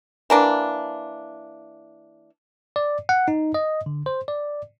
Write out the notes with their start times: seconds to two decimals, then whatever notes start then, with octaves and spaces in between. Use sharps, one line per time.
0.30 E3 A#3 D4
2.76 D5
3.09 F#5
3.28 D#4
3.54 D#5
3.86 D3
4.06 C5
4.28 D5